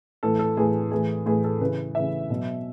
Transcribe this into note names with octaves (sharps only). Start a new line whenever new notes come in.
A2 E3 A4
A4
A2 E3 G#4
A2 E3 G#4
A2 E3 G#4
A4
C#3 E3 B4
C#3 E3 E5
B2 F#3